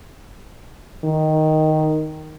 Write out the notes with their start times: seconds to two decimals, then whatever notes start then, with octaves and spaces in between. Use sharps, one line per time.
1.04 D#3